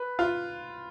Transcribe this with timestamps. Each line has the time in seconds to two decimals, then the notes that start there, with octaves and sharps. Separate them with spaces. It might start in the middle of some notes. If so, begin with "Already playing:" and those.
Already playing: B4
0.19 F4